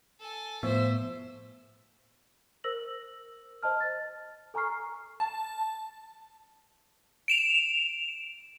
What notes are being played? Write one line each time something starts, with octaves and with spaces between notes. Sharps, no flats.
A4 G#5
A2 F3 B3 C5 E5
A#4 C5 E6 A#6 F#7
C5 D#5 A5 F6
A6
A4 G#5 A#5 C#6 F6 C7
A5
D7 E7 F7